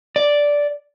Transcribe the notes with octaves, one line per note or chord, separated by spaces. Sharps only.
D5